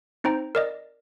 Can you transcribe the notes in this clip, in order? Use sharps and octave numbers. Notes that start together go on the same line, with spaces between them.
C4 D#4 C5 G5 A#5
A#4 D5 D#5